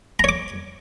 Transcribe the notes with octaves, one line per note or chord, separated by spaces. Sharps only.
C#5 A#5 D6